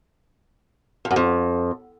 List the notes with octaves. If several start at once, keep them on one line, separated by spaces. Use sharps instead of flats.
F2
F#2
F2